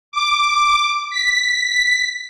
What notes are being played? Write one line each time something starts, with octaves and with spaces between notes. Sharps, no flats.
D6
B6